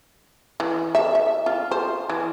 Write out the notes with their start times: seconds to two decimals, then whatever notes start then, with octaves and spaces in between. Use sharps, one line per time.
0.60 E3
0.95 E5
1.15 E5
1.46 F4
1.71 C5
2.10 E3